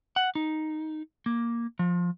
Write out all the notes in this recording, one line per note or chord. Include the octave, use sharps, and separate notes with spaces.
F#5
D#4
A#3
F3